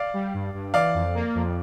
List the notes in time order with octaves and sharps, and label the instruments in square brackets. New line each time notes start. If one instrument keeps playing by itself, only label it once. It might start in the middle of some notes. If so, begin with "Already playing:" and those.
Already playing: [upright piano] D5 F5
[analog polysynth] G3
G2
G2
[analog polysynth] E3 [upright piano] D5 F5
[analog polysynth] F2
A#3
F2